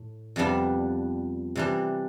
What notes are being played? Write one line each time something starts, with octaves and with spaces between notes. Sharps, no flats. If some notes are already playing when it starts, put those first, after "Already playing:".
Already playing: A2
F2 C3 G3 B3 D4
C3 E3 G3 D4